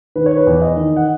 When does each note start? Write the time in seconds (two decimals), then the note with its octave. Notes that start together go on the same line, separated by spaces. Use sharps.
0.16 D#3 B4
0.26 C#5
0.36 B4
0.47 E2
0.62 D#5
0.76 D#3
0.96 F#5